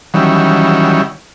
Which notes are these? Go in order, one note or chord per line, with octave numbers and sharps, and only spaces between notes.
D#3 E3 F#3 G3 C#4